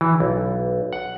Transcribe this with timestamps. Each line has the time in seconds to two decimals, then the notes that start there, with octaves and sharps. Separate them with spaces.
0.01 E3
0.20 B1
0.93 F#5